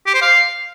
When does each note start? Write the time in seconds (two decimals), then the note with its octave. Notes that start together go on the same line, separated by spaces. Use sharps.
0.07 G4
0.14 C5
0.22 F5